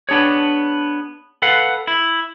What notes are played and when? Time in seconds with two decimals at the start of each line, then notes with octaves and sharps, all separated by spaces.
0.09 B3 D4 G#4 C#5
1.42 A4 B4 F5 F#5
1.87 E4